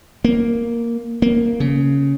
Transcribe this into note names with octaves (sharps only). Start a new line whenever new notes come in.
A#3
A#3
C#3